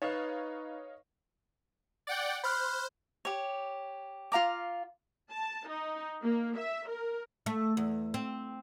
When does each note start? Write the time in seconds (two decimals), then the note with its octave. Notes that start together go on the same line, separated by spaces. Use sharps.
0.02 D#4 B4 C#5 D#5 F5
2.07 D5 F#5 G5
2.44 C5 B5 F6 F#6
3.25 G4 C#5
4.32 F4 F5 A#5 D6
5.33 A5
5.69 D#4
6.23 A#3
6.58 E5
6.89 A#4
7.46 A3
7.77 E2
8.14 C4